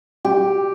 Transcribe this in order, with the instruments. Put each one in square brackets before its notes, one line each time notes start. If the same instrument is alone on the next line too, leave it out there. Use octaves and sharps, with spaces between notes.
[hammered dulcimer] G4